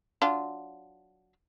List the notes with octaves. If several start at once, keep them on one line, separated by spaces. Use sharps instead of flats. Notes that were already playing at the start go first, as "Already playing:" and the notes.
F#3 D4 F4